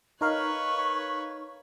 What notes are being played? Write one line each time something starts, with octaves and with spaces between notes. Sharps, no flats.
D#4 A#4 B4 C#5 F5 C#6